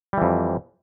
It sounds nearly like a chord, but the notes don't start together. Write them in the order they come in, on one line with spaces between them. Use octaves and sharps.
G3 E3 F2